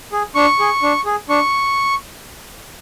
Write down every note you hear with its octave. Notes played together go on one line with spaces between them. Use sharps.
G#4
D4 C#6
G#4
D4
G#4
D4 C#6